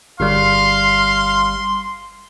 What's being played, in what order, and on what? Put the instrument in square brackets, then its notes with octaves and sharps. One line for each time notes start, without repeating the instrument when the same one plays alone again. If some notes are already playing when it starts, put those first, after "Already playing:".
[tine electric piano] G1 G3 [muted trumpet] F5 [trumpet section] C6